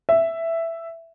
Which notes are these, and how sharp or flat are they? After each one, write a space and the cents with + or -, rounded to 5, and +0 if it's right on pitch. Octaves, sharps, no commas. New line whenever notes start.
E5 +5